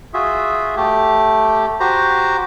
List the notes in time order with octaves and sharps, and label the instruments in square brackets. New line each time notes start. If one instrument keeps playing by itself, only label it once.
[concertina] F4 F#4 G#4 E5
A3 G4
F#4 G4 C5 A#5